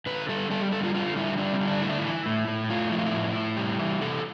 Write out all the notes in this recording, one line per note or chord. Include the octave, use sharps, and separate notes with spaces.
D3 B4
G3 A4
G3 A4
G4
D3 A4
F4
D3 F4
G3 E4
G3 D4
C4
D3
D4
A3 E4
D4
E4
E3
A2
A2
A3 F4
F3 E4
F4
E4
A2
A2
G3
E3
C3 A4